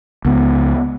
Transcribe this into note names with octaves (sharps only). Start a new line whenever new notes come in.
C#2 B3